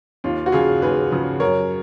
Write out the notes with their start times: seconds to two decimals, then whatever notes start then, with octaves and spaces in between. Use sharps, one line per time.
0.24 D#2 F4
0.46 F#4
0.52 C#3 F3 F4 G#4
0.81 D#2 G#4 B4
1.11 C#3 F3
1.40 F#2 A#4 C#5